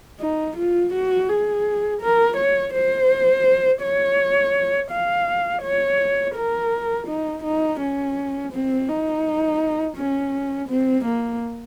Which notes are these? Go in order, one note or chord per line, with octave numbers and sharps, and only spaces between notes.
D#4
F4
F#4
G#4
A#4
C#5
C5
C#5
F5
C#5
A#4
D#4
D#4
C#4
C4
D#4
C#4
C4
A#3